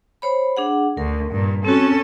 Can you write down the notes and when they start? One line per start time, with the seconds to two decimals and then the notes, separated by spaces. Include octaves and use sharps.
0.22 C5 C#5 B5
0.57 D4 G#4 F#5
0.97 D2 A#4
1.32 G2 A#2
1.65 C4 C#4 F#4 A4